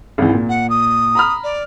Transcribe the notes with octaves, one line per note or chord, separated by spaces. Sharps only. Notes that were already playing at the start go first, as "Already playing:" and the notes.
G#1 C#2 E3
A#2
F#5
D#6
A#5 B5 F6
D5